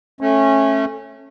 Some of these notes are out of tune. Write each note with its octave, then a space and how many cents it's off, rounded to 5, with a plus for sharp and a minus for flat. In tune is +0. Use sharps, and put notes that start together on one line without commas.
A3 -5 C#4 -20